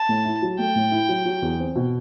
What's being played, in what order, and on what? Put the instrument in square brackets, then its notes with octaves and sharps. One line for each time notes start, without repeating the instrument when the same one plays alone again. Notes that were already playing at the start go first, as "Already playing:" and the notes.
Already playing: [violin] A5
[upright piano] A2
E4
F#3
[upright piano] A3 [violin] G5
[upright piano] A2
E4
F#3
F#3
E2
C4
B2